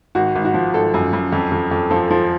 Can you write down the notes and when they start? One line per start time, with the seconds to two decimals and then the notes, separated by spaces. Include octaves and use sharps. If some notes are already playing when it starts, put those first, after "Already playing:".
0.15 G#1 F#4
0.35 G#1
0.45 F#4
0.54 F3
0.74 G#1 A4
0.94 F#2
1.13 F#2
1.32 F2
1.52 F2
1.71 F2
1.90 F3 A4
2.10 F3